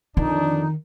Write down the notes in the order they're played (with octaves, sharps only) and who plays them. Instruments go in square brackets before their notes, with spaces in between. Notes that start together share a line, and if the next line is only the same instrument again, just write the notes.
[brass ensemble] F2 D3 D4 [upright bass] D#3 [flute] D#4